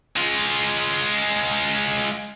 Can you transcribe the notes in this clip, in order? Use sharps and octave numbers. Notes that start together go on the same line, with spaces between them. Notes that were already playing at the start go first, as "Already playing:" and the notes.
G#3 F4